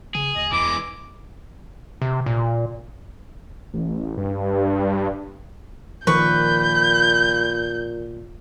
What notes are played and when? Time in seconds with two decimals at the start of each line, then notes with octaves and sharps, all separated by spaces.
0.15 C#3 G#4
0.36 D2 D#5
0.52 E2 E3 G#3 D6
2.02 C3
2.26 A#2
3.73 A1
4.17 G2
6.07 A#2 D#3 F3 B4 C#6 G6